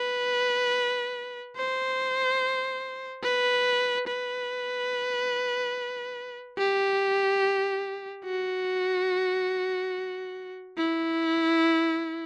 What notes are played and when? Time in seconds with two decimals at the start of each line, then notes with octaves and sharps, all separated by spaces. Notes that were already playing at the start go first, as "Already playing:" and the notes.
Already playing: B4
1.56 C5
3.23 B4
4.07 B4
6.58 G4
8.25 F#4
10.77 E4